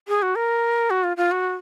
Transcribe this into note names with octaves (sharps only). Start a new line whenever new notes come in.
G#4
F#4
A#4
F#4
F4
F4
F#4